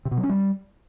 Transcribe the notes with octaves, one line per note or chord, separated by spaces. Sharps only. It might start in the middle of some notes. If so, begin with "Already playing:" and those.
C3
B2
F#3
C#4
G3